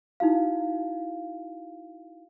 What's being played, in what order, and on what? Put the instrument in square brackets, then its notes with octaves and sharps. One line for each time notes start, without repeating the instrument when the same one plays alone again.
[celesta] D#4 E4 F#4 F5